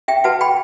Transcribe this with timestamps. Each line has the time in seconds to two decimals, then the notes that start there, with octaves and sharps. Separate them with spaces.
0.08 E5 G5
0.24 F#4 B4 F#5 A5
0.41 G5 B5